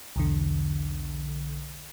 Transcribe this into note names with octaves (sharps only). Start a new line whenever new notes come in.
B1 E2 D3